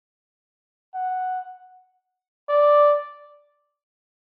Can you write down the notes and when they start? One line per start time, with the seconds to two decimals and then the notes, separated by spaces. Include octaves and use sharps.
0.94 F#5
2.49 D5